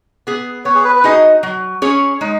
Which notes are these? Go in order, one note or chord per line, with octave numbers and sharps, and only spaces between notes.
B3 G#4
B3 C#5
G#4
B4
B4
D#4 F#4 G#4 D#5
F#3
C#4 G#4 C#5
G#3 D#4